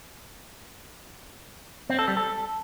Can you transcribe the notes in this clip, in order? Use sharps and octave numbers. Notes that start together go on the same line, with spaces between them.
C4
A4
G3
A4